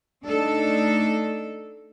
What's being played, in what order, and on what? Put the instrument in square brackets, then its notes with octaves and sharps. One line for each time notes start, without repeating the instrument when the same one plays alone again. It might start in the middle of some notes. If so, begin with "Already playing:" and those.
[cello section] A3 D4 D#4 A4